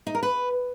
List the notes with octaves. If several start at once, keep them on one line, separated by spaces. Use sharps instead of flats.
D#4
A#4
B4